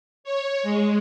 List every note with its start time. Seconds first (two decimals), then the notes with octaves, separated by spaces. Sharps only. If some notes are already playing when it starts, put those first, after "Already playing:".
0.24 C#5
0.63 G#3